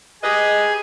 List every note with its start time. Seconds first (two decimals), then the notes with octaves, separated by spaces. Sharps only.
0.23 G4 G#4 B4 D#5